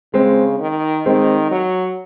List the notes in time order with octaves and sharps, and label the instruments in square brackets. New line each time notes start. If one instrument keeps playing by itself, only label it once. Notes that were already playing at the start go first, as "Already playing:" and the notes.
[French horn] C#3 [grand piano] G#3 C4
[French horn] D#3
[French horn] D#3 [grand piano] G#3 C4
[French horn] F#3